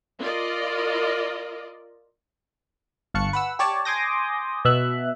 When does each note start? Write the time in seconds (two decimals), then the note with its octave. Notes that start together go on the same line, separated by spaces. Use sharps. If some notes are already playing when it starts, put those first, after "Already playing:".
0.21 F4 A#4 D5 D#5
3.14 G1 F5 A5 C#6 F#6 C#7
3.33 B4 F#5 E6
3.59 G4 C#5 D5 A5
3.85 G#5 C6 D6 D#6 G6 A#6
4.65 B2 E5 F#6